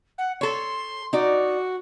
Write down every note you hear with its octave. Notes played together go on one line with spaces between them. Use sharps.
F#5
A4 C#5 C6
D#4 F#4 D5